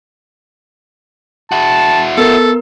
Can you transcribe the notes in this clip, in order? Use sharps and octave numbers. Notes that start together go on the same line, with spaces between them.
E4 F#4 A5
B3 A4 A#4 E6